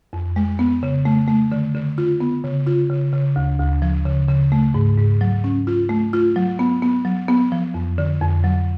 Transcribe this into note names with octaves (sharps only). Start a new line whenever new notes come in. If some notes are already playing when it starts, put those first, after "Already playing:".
F2
G#3
B3
C#3
A3
A3
D3
D3
F4
B3
C#3
F4
C#3
C#3
D2
D2
F3
C#3
C#3
A3
G#2
G#2
F#3
C#4
F4
A3
F4
F#3
B3
B3
F#3
B3
F3
F2
D3
F2
F#3